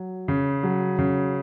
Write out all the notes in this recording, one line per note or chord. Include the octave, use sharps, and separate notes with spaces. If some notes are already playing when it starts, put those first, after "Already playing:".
Already playing: F#3
C#3
F#3
C#3